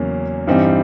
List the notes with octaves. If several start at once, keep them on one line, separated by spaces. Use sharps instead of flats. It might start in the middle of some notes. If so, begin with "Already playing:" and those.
Already playing: E2 C#3 F#3 A#3 C#4
G2 E3 G3 C4 D#4